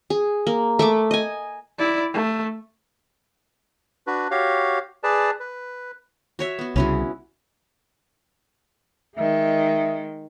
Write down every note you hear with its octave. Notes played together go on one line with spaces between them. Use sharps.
G#4
A#3
A3 E5 D6
D#5 G#5
E4 D5
A3
D4 F#4 B4
F#4 G4 C#5 F5
G#4 B4 D5 A5
B4
F#4 C#5 E5
B3 F#4
C2 C#3 C#4 E4 F#4
D#3 G#3 E5